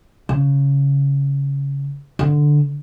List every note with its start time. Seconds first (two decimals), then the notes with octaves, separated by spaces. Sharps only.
0.29 C#3
2.19 D3